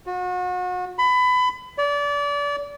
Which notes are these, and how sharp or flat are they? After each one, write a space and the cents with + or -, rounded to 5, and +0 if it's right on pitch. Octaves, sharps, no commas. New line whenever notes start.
F#4 -35
B5 +25
D5 -30